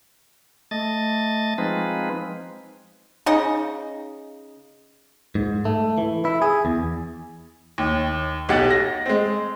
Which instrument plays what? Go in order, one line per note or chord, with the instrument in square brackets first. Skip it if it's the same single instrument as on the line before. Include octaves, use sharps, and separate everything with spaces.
[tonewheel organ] A3 D#5 A6
F3 G#3 C4 D#4 B4
[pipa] C#3 D#4 D#5
[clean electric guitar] G#2
A3
E3
E4
G#4
E2
[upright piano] D#2
B1 G4 F#5 A6
A#6
G#3 C4